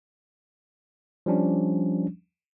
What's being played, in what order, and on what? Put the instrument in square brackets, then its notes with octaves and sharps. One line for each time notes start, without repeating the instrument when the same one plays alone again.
[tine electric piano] F3 G3 C#4 D4